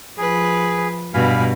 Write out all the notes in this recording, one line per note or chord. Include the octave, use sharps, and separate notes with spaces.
F3 G#4 B4
G2 B2 F5 G#5 B5